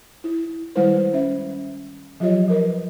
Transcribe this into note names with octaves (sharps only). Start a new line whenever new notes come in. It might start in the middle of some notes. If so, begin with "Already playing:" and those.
E4
D#3 G3 G#3 E4 B4 C5
C#4 E5
F3 F#3 F4 G4 C#5 D#5
F3 A#4 B4